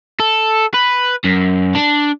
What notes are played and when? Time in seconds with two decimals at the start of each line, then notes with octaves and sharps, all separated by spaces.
0.20 A4
0.74 B4
1.25 F#2
1.75 D4